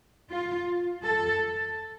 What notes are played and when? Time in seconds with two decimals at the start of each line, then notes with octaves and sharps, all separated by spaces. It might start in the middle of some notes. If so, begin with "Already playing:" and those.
0.30 F4
1.04 A4